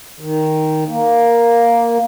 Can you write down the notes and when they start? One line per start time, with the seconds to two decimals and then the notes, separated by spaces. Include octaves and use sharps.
0.20 D#3
0.88 A#3